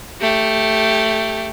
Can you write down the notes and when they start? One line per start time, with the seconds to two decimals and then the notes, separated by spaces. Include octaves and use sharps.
0.21 A3 G4